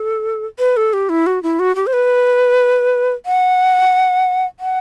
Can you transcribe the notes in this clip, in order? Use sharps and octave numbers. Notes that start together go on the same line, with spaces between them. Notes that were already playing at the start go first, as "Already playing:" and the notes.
Already playing: A4
B4
A4
G4
E4
F#4
E4
F#4
G4
C5
B4
F#5
F#5